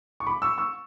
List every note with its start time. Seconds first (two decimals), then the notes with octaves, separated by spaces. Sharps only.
0.20 C#6
0.27 B5 D6
0.42 C#6 E6
0.58 C#6 E6